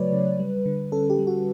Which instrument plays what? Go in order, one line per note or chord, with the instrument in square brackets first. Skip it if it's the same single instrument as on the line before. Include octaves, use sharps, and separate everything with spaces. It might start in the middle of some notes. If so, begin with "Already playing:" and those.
Already playing: [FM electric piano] C#3 F#3 A3 B4 C#5 D5
C#3
G3
D3
C#4 A4
G4
G3
F#4